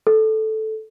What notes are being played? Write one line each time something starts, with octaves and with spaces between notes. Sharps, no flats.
A4